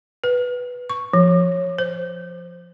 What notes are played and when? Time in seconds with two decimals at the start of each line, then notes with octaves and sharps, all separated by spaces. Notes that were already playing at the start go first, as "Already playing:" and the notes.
0.24 B4
0.90 C#6
1.13 F3
1.78 C5